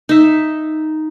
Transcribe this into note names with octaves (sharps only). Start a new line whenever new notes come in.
D#4 E5